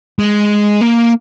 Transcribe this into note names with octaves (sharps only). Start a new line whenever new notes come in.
G#3
A#3